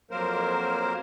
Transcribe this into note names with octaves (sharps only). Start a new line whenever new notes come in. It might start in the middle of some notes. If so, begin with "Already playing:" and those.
F2 F#3 A#3 A#4 C5